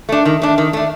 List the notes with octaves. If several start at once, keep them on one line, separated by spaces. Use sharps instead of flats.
A3 D4
D#3
A3 D4
D#3
A3 D4